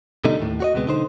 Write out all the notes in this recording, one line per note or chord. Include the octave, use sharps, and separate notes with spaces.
B2 D3 G3 A3 D#4
D#2 A2
F#4 C#5 D#5
D2 C3 G#3 B3
B1 D3 D#4 C5